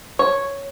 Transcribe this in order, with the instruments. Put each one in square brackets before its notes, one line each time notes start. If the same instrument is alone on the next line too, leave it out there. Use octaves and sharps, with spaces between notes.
[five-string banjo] C#5